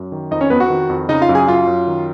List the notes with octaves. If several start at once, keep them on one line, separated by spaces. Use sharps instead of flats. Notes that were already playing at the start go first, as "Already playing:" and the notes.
Already playing: F#2
D#3
F2 D#4 D#5
C#4 C#5
F2 B3 B4
F#4 F#5
D#3
F2
C#3 D#4 D#5
F4 F5
F#2
G#4 G#5
F#2 F4 F5
F#2
D#3